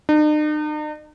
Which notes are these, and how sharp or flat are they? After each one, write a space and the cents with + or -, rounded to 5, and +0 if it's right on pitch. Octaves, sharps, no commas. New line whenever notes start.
D#4 -45